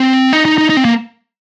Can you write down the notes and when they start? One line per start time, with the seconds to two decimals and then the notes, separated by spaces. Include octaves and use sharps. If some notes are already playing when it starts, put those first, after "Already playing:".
Already playing: C4
0.33 D#4
0.45 D#4
0.58 D#4
0.70 D#4
0.77 C4
0.85 A#3